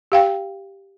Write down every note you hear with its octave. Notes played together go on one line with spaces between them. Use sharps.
G4 F5 G5